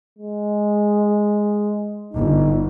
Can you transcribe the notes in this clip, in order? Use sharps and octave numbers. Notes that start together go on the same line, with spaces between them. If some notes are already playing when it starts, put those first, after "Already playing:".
G#3
G1 D#4